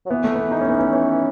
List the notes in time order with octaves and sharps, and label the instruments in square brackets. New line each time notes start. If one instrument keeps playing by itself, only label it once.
[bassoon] F#3
[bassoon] E3 [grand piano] B3
[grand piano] A3
B3
D#4
C#4
B3
C#4
C#4